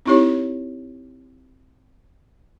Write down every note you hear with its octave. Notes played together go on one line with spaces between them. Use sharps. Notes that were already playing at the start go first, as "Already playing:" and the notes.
C4 D#4 E4 G4 C#5